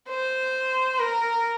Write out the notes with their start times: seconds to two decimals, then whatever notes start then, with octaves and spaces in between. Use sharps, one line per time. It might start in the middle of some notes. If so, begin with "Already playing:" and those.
0.09 C5
0.99 A#4